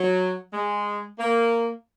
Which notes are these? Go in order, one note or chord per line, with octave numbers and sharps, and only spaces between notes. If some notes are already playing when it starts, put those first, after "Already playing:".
Already playing: F#3
G#3
A#3